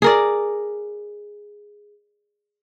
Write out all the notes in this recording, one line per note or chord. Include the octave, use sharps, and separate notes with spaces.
G#4 A#4 D5